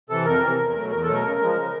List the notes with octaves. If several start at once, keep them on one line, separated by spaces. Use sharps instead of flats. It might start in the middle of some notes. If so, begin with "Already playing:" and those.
C3 E3 A4
F2 A#4
C3 E3
E2
B2 F#3 A3
E2 A#4
A4
B2 F#3 A3
A#4
C#3
F3 G#3
C#3